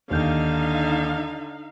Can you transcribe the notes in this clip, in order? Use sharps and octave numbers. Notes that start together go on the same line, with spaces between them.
D#2 D3 D#4 F5 G6